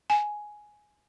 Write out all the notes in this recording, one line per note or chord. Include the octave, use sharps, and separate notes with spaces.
G#5